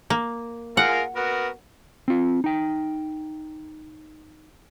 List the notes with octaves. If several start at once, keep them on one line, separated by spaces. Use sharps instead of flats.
A#3
F4 G#4 A#4 F#5
B3 F#4 A#4
C4 F4
D#4 G5